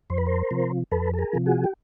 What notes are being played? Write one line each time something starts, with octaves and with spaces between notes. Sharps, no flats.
F2 C5
B4
A#4 C5
C3 F3
F2 A4 B4
A4
G#4 A#4
C3 F3
F#4 G#4
G4